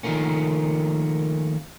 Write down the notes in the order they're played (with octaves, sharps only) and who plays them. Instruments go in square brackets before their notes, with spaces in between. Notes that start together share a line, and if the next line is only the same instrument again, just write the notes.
[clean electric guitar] D#3 F3 A3 A#3 C#4